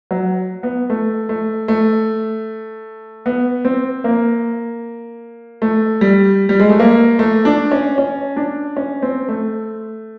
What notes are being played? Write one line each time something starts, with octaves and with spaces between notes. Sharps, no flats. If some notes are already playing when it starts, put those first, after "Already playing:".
F#3
B3
A3
A3
A3
B3
C4
A#3
A3
G3
G3
G#3
A3
A#3
A3
D4
C#4
C#4
D4
C#4
C4
A3